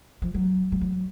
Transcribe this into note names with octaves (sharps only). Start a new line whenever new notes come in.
F3
F#3
G3
F#3